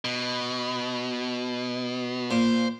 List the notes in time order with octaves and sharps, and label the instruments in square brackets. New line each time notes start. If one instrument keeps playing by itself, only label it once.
[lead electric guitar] B2
[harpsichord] A#2 [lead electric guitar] C5